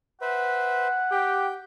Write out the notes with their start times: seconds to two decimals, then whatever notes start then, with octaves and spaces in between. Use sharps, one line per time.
0.22 B4 C5 E5 F#5
1.11 G4 G5